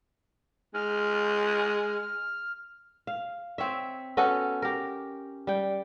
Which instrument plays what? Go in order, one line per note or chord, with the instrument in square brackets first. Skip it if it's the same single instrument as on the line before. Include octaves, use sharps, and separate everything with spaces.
[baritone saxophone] G#3 [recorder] F6
[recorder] F6
[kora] F5
C4 C#5 E5
B3 C#4 F#4 A4
G4 A#4
G3 G5